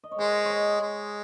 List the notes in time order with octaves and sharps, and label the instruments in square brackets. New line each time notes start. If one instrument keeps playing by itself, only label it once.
[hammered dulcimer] D#5
C#5
[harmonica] G#3 [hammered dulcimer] C5
[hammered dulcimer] C#5
D#5
[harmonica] G#3